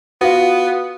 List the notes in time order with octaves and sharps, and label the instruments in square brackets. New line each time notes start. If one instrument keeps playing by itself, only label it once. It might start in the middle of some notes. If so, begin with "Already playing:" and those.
[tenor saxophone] B3 [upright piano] F4 F#4